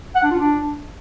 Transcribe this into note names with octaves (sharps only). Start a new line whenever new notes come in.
F#5
D4
F4
D4